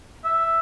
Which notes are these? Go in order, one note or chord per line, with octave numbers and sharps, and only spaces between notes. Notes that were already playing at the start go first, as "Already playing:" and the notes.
E5